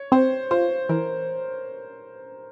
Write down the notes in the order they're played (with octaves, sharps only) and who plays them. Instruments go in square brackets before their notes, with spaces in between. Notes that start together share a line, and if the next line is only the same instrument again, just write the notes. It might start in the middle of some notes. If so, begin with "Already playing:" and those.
Already playing: [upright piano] C#5
[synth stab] C4 [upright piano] C5
[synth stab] F4 [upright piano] C5
[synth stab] E3 [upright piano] A#4